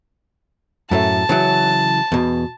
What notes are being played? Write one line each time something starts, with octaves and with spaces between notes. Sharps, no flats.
F#2 A2 A3 A5
C#3 E3 F#3
E2 B2